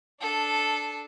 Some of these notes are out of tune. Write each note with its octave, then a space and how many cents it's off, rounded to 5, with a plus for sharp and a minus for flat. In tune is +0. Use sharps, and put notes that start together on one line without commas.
D4 +0 A4 -10